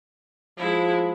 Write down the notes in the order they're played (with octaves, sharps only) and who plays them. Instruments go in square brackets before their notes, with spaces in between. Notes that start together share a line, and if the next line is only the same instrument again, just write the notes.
[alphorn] F3 [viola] G#3 E4